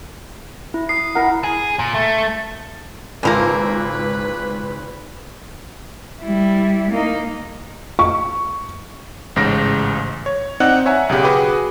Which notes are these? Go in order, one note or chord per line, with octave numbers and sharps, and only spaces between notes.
E4
D#6 C7
E4 A#4 F#5 B5
G#4
A#2
A3
G#1 C#2 E3 F3 A#3 B4 E6
G3 E4
A#3 D#4
C#6
A1 G#2 C#3 A#6 D7
C#5
C4 D#4 D5 F#5 F#6
C#5 E5 F#5 G#5 A#5
B1 C#3 G4
F#4 G#4 B4 G5 D6